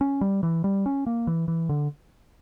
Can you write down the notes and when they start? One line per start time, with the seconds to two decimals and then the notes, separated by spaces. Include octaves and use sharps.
0.01 C#4
0.21 G3
0.43 E3
0.64 G3
0.86 C#4
1.06 A#3
1.27 E3
1.48 E3
1.69 D3